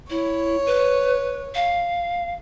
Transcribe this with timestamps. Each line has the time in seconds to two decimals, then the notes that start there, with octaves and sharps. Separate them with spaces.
0.10 E4 C#5
0.66 B4
1.55 F5